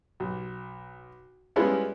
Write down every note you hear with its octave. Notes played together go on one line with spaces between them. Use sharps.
B1
G3 G#3 B3 C#4 E4 F4